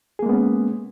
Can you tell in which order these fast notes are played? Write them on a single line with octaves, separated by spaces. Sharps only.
G#4 A#3 G#3 B3 C#4